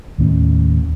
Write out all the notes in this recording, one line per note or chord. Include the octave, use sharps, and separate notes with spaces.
D#2 A2 C#4